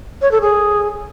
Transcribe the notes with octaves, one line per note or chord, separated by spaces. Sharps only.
C#5
A4
G#4